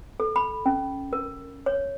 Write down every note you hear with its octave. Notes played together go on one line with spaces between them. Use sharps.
A4
B5
C#4
A#4
C#5